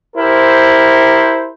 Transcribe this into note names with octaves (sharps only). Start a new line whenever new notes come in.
E4 G4 A#4 C5